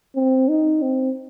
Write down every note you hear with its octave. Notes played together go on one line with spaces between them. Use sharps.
C4
D#4
C4